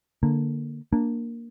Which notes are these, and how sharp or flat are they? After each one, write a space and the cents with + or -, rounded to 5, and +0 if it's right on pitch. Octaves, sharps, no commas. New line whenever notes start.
D3 +0 A#3 +0
A#3 +0 D4 +0